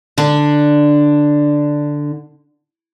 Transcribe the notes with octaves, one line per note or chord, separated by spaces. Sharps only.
D3 D4